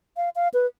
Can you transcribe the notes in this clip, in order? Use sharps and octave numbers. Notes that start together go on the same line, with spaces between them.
F5
F5
B4